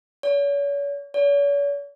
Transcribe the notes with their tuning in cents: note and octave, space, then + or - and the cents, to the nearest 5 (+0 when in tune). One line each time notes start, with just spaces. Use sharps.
C#5 +40
C#5 +45